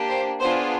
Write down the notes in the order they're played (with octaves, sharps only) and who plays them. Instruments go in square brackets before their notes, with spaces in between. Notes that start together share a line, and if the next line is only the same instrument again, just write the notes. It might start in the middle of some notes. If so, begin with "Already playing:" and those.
Already playing: [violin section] A#3 D4 G4
C5
B3 D4 F4 G#4 C5